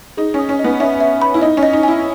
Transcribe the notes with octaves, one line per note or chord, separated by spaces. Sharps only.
D#4 G#4
C#4 D#6
C#4
D#5
B3
C#4 E5
E5
B5
E4
D#4 D#5
C#4
D#5
D#4
E4 G#5